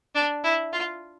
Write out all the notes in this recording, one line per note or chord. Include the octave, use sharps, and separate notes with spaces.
D4
E4
F4